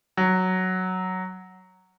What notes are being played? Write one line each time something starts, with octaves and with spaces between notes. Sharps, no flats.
F#3